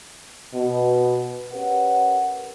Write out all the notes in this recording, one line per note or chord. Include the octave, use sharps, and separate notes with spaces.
B2
C#4 G4 A#4 B4 F#5